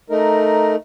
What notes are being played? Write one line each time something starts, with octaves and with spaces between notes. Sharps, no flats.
A3 D#4 A#4